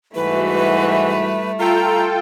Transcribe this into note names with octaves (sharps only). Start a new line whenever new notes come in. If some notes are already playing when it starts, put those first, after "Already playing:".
G#2 E3 G3 A3 E4 F#4 B4
F4 A4 G5 A#5